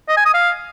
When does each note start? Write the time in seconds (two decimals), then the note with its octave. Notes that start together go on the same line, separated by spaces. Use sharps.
0.08 D#5
0.17 G#5
0.25 D#6
0.34 F5